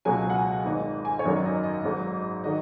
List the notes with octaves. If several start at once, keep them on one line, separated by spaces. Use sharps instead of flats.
C#2 B2 F#3 G#5
F#5
G#5
G#1 G#2 D#3 D#5
G#5
C#5
G#1 F#2 D#3 F#3 D#5
D#5
D#5
G#1 G#2 F#3
D#3 F#3 D#5